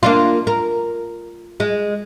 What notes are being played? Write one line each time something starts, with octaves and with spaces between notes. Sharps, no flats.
A#3 D4 F4
A#4
G#3